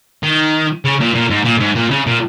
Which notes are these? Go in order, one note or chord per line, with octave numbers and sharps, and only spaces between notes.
D#3
C#3
A#2
A#2
G#2
A#2
G#2
A#2
C#3
A#2